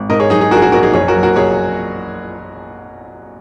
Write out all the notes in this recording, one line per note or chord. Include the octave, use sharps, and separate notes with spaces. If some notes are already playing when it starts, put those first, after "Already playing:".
Already playing: G#1
G#2 A#4 D#5
G#4 C#5
F#3 D#4 G#4
D#4 G#4
A#1 F#4 A#4
G#4
F#4 A#4
A#1 F#4 A#4
D#4 G#4
F#1 G#4 C#5
F#4 A#4
F#3
F#4 A#4
F#1 G#4 C#5